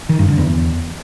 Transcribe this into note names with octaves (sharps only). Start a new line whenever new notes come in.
D#3
G2
D3
E2